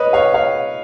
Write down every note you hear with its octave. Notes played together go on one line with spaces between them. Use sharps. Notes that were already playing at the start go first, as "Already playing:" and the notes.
Already playing: B4 C#5 D#5
C#5 F5
C#5 F5